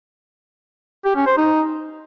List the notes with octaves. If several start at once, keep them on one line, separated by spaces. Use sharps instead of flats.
G4
C#4
C5
D#4